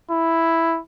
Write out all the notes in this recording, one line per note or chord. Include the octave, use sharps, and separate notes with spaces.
E4